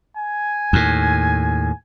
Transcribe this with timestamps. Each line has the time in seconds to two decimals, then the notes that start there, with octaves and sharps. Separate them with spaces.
0.17 G#5
0.73 D#2 A2